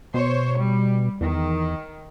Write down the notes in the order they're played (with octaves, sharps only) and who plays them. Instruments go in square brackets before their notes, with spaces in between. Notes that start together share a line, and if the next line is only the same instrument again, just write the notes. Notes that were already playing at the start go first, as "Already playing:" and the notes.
[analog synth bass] B2 [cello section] C5 C#5
[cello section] G3
[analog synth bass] E2 [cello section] D#3